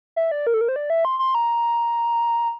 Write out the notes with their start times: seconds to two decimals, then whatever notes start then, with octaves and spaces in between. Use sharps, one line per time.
0.16 E5
0.31 D5
0.47 A#4
0.54 A4
0.61 A#4
0.68 C5
0.76 D5
0.90 E5
1.05 C6
1.19 C6
1.35 A#5